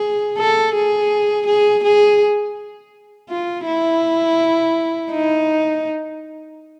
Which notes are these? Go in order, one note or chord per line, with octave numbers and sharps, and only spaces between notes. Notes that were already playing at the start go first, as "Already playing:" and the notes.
Already playing: G#4
A4
G#4
G#4
G#4
F4
E4
D#4